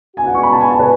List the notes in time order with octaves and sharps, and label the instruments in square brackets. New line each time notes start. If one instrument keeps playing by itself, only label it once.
[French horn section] B2 G#3 B3 D4 F#4 [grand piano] G#5
[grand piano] F#5
C#6
B5
A5
G#5
A5
B4